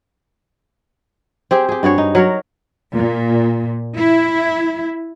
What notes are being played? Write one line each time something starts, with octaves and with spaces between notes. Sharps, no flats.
C4 G4 G#4
G4 G#4
G2 F#4 G#4 C#5
D#4
F#3 A#4 C#5
A#2
E4